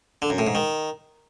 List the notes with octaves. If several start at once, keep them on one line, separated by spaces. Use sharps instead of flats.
D3
F#2
A2
G#2
D#3